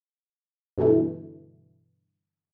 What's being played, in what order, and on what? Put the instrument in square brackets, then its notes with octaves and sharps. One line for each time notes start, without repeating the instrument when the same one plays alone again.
[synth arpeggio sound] G2 B2 D3 E3 A3